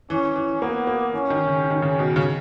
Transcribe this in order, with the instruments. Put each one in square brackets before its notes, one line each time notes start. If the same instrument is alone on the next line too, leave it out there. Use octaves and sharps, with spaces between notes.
[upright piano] E3 [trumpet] C#4
[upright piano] E3
[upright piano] A#3 [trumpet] B3
[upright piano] A#3
[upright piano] E3 [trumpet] C#4
[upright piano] D#3
C#3
D#3
C#3
B2
C#3